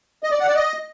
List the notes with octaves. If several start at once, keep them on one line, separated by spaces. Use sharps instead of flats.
D#5
D5
F#5
D5
D#5